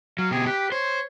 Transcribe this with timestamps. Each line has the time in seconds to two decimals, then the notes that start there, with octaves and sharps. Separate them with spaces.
0.19 F#3 F5
0.31 B2 G4 G#4
0.46 G4 B4
0.72 C5 C#5